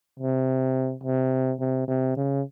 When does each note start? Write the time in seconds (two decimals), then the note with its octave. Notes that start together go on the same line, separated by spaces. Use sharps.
0.19 C3
1.03 C3
1.60 C3
1.88 C3
2.16 C#3